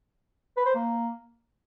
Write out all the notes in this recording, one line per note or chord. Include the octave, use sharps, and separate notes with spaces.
B4
C5
A#3